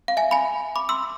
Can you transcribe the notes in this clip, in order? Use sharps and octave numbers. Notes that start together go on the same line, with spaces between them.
F5
E5 G#5
G#5 B5
B5 D6
C6 E6